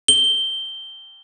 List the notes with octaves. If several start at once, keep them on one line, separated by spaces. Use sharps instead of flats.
G7